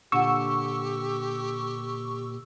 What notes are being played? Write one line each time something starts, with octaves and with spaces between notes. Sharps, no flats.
A#2 D3 G4 C#6 E6